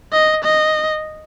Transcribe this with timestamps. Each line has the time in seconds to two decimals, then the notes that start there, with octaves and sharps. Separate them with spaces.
0.13 D#5
0.44 D#5